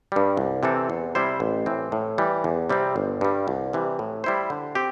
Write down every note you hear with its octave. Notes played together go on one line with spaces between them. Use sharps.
G2 G3
C2
C3 E3 C4 A4
E2
C3 G3 E4 C5
A1
A2 E3 C4
A2
E3 G3
E2
C3 G3 C4
G1
G2 G3
C2
C3 E3 G3
A2
G3 E4 C5
D3
C4 G4